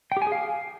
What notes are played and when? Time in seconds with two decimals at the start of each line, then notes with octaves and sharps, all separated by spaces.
0.12 G5
0.17 G4
0.22 G#5
0.27 G#4
0.32 F5